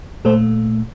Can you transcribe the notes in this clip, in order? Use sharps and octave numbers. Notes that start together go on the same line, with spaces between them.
A#2 A3 A4 C5